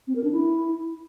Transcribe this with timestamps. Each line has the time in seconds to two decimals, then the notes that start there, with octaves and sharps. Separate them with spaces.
0.07 C4
0.16 A#4
0.24 D4
0.32 E4